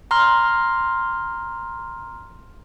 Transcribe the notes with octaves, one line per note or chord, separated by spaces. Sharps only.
A#5 C6 F6